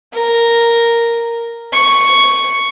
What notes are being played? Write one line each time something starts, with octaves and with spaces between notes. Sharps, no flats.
A#4
C#6